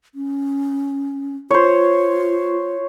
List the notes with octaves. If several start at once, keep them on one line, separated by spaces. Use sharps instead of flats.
C#4
F4 C5 C#5